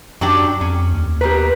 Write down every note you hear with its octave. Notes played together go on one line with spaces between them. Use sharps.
F#2 F#3 D4 G4
F2 C#4
D#2
B2 G4 A#4 B4